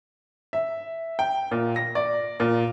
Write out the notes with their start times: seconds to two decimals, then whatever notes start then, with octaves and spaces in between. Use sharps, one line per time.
0.53 E5
1.19 G5
1.51 A#2
1.76 A#6
1.95 D5
2.40 A#2